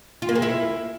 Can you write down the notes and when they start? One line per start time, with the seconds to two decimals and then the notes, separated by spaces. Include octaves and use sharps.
0.22 F4
0.29 A#3
0.35 G#4
0.42 E4